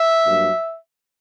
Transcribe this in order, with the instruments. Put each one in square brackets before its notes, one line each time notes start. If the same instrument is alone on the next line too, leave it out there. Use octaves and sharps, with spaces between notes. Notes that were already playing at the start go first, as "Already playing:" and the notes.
Already playing: [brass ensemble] E5
G2 F#3 A#3